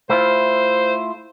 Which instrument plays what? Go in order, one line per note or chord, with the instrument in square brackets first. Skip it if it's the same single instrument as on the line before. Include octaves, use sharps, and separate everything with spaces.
[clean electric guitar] A3 E4 F4 [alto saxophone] C5